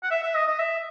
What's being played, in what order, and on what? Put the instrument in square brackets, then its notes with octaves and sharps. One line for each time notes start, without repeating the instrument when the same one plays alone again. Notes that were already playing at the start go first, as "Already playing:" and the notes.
[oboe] F#5
E5
E5
D#5
D#5
E5